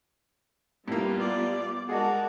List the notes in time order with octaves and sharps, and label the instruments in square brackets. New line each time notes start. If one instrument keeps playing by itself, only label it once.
[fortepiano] A2 A#3 [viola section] G3 B3 F4
[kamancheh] D5
[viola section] G#3 A#4 [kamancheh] F#4 D5 [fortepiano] G#4 D#5 A5